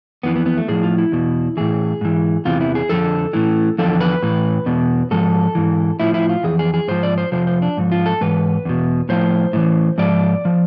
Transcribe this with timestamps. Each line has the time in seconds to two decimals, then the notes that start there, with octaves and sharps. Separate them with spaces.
0.23 F2 E3 B3
0.36 B3
0.46 B3
0.58 A3
0.68 A2 F3 G#4
0.83 F4
0.98 E4
1.12 E2 B2
1.57 A2 E3 G#4
2.01 G#2 E3
2.45 E2 C3 E3 F4
2.61 E4
2.75 G#4
2.89 F2 D3 F3 A4
3.33 A2 E3
3.78 E2 D3 F3 A4
4.00 B4
4.22 A2 E3
4.66 E2 B2
5.11 G#2 F3 A4
5.55 G#2 E3
6.00 A2 F3 E4
6.14 E4
6.29 F4
6.43 F2 E3 G#4
6.59 G#4
6.74 G#4
6.88 G#2 F3 C5
7.03 D5
7.18 C5
7.32 F2 C3 F3 C5
7.47 C5
7.62 D4
7.77 G#2 F3
7.92 F4
8.06 A4
8.21 G#2 E3 B4
8.65 E2 B2
9.09 A2 F3 C5
9.53 A2 E3
9.98 G#2 F3 D5
10.45 F3